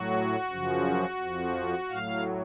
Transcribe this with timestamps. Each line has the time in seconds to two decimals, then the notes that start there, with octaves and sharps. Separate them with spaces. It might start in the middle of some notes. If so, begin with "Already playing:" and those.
Already playing: A2 F#3 F#4
0.49 F#2 C#3 F3
1.19 F2 F3
1.88 A2 F#3 F5